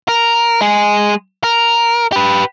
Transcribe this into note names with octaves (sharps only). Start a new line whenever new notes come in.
A#4
G#3 G#4
A#4
G4 B4